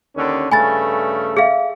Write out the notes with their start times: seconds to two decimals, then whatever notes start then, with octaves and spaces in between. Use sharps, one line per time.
0.15 D#2 D3 C#4
0.52 G2 C#3 A3 G#5 B5 A6
1.37 G#4 E5 F5